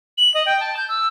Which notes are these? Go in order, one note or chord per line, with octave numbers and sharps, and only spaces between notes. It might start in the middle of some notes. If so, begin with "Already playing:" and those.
F#7
D#5
G5
A5
G6
E6